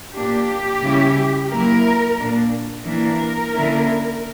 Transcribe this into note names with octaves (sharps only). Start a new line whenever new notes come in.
A#2 A#3 D4 G4
C#3 G3 C#4 E4
F#3 A#3 E4 A#4
A#2 A#3 D4
E3 A#3 D4 A#4
D3 A#3 C#4 E4